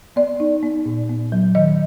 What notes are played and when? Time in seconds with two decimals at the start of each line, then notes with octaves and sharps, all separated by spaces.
0.16 B3 D5
0.40 D#4
0.63 B3
0.86 A#2
1.09 B3
1.32 F#3
1.55 D#3 D#5